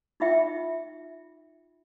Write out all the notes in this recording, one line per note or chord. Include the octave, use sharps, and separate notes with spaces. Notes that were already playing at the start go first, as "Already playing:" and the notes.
D#4 F4 E5 G5